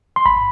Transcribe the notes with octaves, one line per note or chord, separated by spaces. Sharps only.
C6
G#1 B5